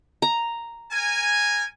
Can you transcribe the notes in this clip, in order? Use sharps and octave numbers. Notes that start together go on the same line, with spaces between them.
A#5
A#4 G#5